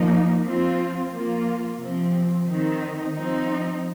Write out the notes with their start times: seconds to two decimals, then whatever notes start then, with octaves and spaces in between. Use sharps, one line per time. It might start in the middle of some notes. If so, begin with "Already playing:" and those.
Already playing: F3 A#3 D#4
0.43 F3 C4 F4
1.12 F3 A#3 F4
1.80 C3 F3 C4
2.48 D#3 C4 D#4
3.16 F3 C4 D#4